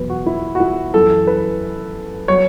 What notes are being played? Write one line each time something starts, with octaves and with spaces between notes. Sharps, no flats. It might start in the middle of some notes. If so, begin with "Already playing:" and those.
Already playing: E2 B2 F#3 B4
F#4
E4
F#4
E4
F#2 E3 A4
B4
F#3 C#5